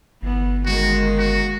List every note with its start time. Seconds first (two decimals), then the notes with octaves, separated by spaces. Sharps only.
0.22 G1 E3 B3
0.66 D#3 G#3 A#3 F#4
1.19 F#4